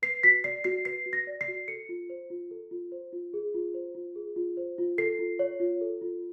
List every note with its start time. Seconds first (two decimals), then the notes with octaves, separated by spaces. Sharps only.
0.02 B4 C7
0.23 F#4 B6
0.44 D5 C7
0.64 F#4 C7
0.85 B4 C7
1.06 F#4
1.13 A#6
1.27 D5
1.41 C7
1.48 F#4
1.68 A4 C#7
1.89 F4
2.10 C5
2.30 F4
2.51 A4
2.71 F4
2.92 C5
3.13 F4
3.34 G#4
3.54 F4
3.74 C5
3.95 F4
4.16 G#4
4.36 F4
4.57 C5
4.78 F4
4.98 A4 C7
5.19 F4
5.39 C#5
5.60 F4
5.81 A4
6.01 F4